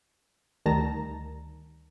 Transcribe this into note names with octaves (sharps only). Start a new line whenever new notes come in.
D2 D#3 G3 A5 A#5 A#6